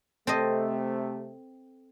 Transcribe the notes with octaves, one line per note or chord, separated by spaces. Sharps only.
C3 A3 C4 A4 D#5